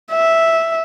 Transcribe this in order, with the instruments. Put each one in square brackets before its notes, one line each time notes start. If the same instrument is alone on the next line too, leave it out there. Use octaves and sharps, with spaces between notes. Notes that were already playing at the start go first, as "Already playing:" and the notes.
[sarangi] E5